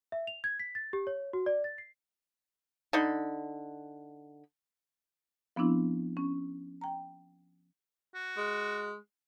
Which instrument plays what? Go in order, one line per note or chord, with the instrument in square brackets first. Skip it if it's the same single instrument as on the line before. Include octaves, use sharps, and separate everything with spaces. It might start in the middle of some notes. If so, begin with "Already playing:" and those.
[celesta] E5
F7
G#6
B6
A6
G4
C#5
F#4
D5
A6
C7
[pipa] D3 D#4 B5
[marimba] F3 B3 C4 D4 E4
C#4
G5 A#5
[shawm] F#4
[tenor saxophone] G#3